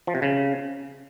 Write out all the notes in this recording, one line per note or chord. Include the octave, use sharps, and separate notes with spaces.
F3
C3
C#3